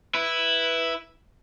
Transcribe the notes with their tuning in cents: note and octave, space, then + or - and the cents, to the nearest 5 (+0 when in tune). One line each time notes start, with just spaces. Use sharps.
E4 +0 B4 +0